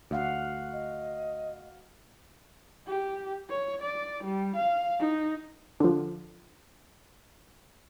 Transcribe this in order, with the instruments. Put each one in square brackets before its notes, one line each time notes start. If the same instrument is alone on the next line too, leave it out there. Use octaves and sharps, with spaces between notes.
[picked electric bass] D2 [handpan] F#4 F5 F#5
[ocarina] D#5
[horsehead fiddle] G4
C#5
D5
G3
F5
D#4
[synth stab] D3 F3